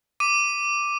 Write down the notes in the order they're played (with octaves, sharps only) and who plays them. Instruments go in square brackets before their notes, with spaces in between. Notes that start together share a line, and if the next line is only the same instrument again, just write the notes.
[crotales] D6 D#7